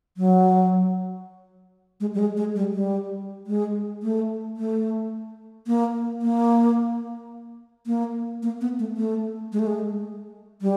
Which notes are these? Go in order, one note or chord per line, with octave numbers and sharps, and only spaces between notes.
F#3
G#3
G3
G#3
G#3
G3
G3
G#3
A3
A3
A#3
A#3
A#3
A#3
B3
A3
A3
G#3
A3
G#3
G3